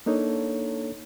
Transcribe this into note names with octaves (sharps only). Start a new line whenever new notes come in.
A#3 D4 D#4 A4 C#5